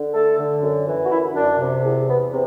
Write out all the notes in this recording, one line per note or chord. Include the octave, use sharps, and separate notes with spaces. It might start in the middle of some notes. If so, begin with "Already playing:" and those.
Already playing: D3
A3 A4
D3
F#2
E3
F#4
F#2 E4
F#2 D4
C3
E2
E2 B3
C3